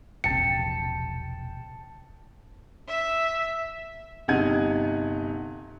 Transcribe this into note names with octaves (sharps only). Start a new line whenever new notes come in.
E1 A#1 C3 G5 A5 C#7
E5
G1 C3 D#4 F#5 G#6 D#7